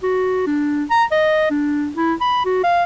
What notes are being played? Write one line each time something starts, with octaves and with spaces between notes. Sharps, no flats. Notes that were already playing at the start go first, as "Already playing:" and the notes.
F#4
D4
A#5
D#5
D4
E4
B5
F#4
F5